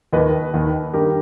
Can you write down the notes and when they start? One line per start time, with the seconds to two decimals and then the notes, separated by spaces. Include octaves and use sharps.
0.13 D#2 D#3 B4 D#5
0.54 D#2 D#3
0.93 G2 D#3 G4 A#4